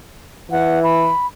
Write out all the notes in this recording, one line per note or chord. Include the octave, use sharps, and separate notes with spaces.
E3 F#5
B5